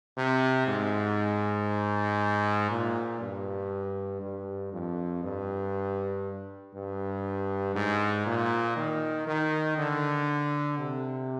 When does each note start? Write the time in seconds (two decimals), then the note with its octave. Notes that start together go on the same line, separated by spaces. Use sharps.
0.17 C3
0.67 G#2
2.70 A#2
3.21 G2
4.22 G2
4.72 F2
5.23 G2
6.74 G2
7.75 G#2
8.26 A#2
8.77 D#3
9.27 D#3
9.78 D3
10.78 C3